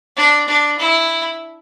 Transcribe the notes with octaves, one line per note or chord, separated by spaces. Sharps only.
D4
D4
E4